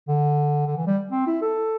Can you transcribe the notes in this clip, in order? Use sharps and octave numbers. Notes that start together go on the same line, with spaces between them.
D3
D3
E3
G3
C4
E4
A4